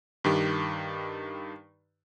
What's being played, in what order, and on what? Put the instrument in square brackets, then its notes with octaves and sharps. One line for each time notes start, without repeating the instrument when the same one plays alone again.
[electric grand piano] G2 D#3 G4